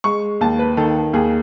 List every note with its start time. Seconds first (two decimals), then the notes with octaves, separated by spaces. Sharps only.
0.04 G#3 C#6
0.41 D#2 A5
0.59 B4
0.77 D#3 A4
1.13 D#2 G#4